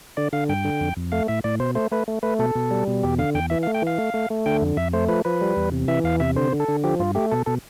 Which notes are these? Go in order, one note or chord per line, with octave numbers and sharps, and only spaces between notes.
D3 D5
D3 F5
G2 G5
D3
F2
F2
A3 F5
A2 E5
A2 D5
B2 C5
A3 C5
A3 B4
A3
A3 B4
B2 A4
B2
G3
B2
E2 G4
D3 F5
E2 G5
E3 E5
F5
A3
G5
E3 F5
A3
A3
A3
D3 G5
F2
F2 E5
A3 C5
F3 B4
F3 B4
G3
E2
C3
E3 E5
E2 F5
C3 E5
D3 C5
D3
A4
D3
F3 G4
G2 F4
A3 G4
B2 A4
B2 A4